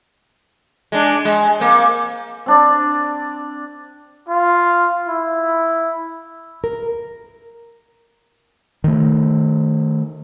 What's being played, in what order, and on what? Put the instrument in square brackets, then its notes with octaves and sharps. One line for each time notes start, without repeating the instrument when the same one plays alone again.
[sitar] G#3 D4
G#3
A#3 C4
[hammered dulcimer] C4 D4 D5
[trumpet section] F4
E4
[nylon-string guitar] A#4
[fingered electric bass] D#3 A3